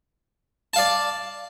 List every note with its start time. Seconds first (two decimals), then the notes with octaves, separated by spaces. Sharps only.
0.73 A5
0.76 F5
0.79 D5